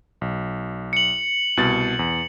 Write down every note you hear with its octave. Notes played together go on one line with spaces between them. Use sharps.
B1
C#7 F#7
C2 B2 A6
E2